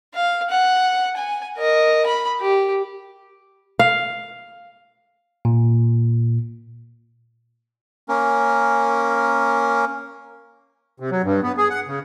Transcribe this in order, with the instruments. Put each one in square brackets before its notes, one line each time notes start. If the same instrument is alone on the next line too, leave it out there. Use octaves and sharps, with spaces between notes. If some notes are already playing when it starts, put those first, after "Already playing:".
[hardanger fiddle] F5
F#5
G#5
A#4 D#5
B5
G4
[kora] F5
[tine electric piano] A#2
[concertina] A#3 C#4 A#4
[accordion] C3
F#3
G2
B3
G#4
F#5
C#3